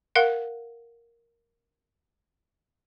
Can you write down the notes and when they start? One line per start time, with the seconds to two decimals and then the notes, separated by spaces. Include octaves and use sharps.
0.15 A#4 F5 F#5